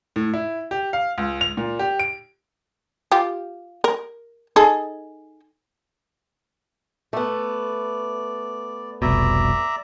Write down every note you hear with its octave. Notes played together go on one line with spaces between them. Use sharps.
A2
E4
G4
F5
C#2
F7
A#2
G4
D7
F4 G4
A#4
D#4 G#4 A4
A3 B3 D5
F1 C2 B2 D5 E5 A#5